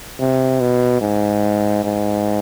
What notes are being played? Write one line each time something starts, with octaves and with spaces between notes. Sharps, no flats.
C3
B2
G#2
G#2